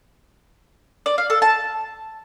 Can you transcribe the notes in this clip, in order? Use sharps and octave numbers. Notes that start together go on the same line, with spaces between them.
D5
F5
A4
A5